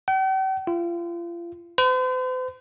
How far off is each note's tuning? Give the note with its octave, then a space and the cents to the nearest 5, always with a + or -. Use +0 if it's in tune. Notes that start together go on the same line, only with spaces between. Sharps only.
G5 -45
F4 -35
C5 -45